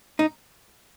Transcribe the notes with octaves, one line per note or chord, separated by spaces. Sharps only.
D#4